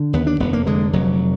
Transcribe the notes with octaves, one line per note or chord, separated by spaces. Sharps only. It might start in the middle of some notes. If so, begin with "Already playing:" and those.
Already playing: D3
D#2 B3
D4
F1 B3
A#3
D3 G#3
F1 F#3